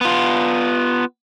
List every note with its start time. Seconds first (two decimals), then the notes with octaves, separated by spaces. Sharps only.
0.01 B3 F4